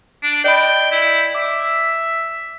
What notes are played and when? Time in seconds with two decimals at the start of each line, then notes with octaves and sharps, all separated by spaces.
0.23 D4
0.44 D5 D#5 G5 B5
0.92 E4
1.35 E5 D6